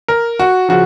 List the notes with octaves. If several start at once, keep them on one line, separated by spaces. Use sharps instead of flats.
A#4
F#4
C#3 F3 F#4